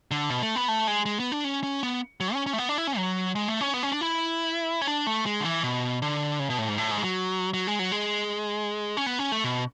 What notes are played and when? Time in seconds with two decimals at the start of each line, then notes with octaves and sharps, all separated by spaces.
0.11 D3
0.30 B2
0.42 A3
0.56 B3
0.68 A3
0.88 G#3
1.06 G#3
1.20 B3
1.32 D4
1.44 C#4
1.63 C#4
1.83 B3
2.20 F#3
2.34 C#4
2.46 C#4
2.53 A3
2.58 B3
2.69 D4
2.78 E4
2.87 C#4
2.97 F#3
3.36 G#3
3.48 A3
3.61 C#4
3.74 B3
3.83 C#4
3.92 D4
4.01 E4
4.81 C#4
4.87 D4
5.07 A3
5.26 G#3
5.40 D3
5.45 E3
5.63 B2
6.02 D3
6.39 C#3
6.50 B2
6.59 A2
6.68 G#2
6.78 A2
6.91 G#2
6.98 G#3
7.04 F#3
7.54 F#3
7.67 G#3
7.79 F#3
7.92 G#3
8.97 C#4
9.06 B3
9.19 C#4
9.32 A3
9.44 B2